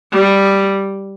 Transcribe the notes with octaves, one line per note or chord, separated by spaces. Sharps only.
G3